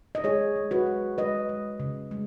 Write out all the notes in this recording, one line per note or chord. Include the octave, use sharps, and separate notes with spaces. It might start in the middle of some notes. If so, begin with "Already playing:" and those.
D#5
G#3 G#4 C#5
G#3
F#4 B4
G#3
G#3 B4 D#5
G#3
C#3
G#3